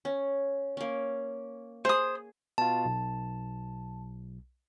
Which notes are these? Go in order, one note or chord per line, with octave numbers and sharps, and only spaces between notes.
C#4
A#3 C#4
G#4 C5 D#6
B2 F4 A5
B1